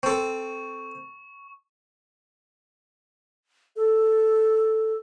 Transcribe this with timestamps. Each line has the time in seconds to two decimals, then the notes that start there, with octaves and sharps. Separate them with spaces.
0.03 C4 A4 C#6
3.76 A4